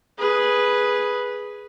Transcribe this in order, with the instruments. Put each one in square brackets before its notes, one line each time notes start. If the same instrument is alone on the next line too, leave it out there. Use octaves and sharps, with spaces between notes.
[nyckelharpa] G#4 B4